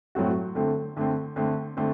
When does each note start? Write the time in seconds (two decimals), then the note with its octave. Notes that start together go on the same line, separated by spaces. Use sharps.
0.15 A2 F#3 A3 C4 F#4
0.55 D3 A3 C4
0.97 D3 A3 C4
1.36 D3 A3 C4
1.77 D3 A3 C4